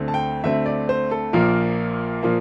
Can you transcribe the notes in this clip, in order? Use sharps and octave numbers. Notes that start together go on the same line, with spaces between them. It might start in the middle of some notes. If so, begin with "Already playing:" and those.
Already playing: D2 D3 A3 C4
A5
G5
D2 D3 A3 C4 E5
D5
C5
A4
A#1 A#2 F3 A#3 A#4
A#2 F3 A#3